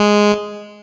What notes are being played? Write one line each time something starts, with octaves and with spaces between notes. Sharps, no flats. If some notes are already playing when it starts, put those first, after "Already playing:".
Already playing: G#3